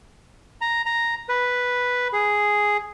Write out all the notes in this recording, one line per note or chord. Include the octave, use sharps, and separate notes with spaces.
A#5
A#5
B4
G#4